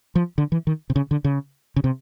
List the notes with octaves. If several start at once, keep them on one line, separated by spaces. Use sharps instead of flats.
F3
D3
E3
D#3
C3
C#3
D3
C#3
C#3
C3